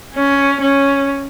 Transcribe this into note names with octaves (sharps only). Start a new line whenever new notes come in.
C#4
C#4